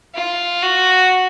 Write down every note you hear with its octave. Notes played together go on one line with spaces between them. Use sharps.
F4
F#4